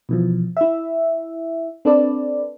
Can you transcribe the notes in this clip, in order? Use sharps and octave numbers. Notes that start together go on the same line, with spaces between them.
B2 E3 F3
E4 E5
C4 D4 A4 B4 D5